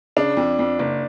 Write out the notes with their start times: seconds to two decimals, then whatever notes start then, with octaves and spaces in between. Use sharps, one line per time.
0.17 C#3 D4
0.37 F2
0.59 F2
0.79 F#1